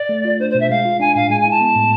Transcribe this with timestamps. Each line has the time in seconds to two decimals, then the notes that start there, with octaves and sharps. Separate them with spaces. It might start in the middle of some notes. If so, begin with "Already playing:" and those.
Already playing: D5
0.09 A3
0.25 F4
0.39 D4 C5
0.50 C5
0.55 B2
0.60 E5
0.69 G#3 F5
0.85 F4
1.00 D4 G#5
1.15 A2 F5
1.30 G#3 G#5
1.40 G#5
1.46 E4 A5
1.61 B3
1.76 A2